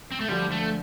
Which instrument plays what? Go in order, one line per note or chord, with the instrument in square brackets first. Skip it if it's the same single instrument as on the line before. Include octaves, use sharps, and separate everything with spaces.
[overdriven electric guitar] C4
A3
[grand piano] D2 D3 F3 D4 [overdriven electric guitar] G3
[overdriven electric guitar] A3